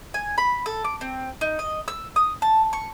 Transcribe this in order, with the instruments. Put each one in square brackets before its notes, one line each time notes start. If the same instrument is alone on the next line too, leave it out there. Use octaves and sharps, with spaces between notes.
[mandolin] G#5
B5
A4
D6
C4
D#4
D#5
E6
D#6
A5
C#6